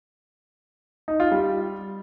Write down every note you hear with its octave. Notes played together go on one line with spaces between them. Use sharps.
D#4
F4
G3